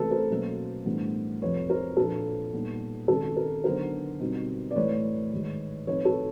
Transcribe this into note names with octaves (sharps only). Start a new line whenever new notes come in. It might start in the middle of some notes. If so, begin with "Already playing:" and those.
Already playing: C3 E3 A3 C#4 A4 B4
A#4 C5
B2 F#3 A#3 C#4
A2 E3 G3 B3 D4
F2 C3 F3 B4 C#5
A#4 C5
A#2 F3 A#3 D4 A4 B4
A#2 G3 B3 D#4
C3 D#3 G#3 C#4 A4
A#4
D3 F#3 B3 D#4 A#4 C5
B2 G3 C4 D#4
D5
A2 E3 A3 B4 C#5
G#2 D#3 G#3
A2 F3 A3 C4 D#4 B4 C#5
A4 B4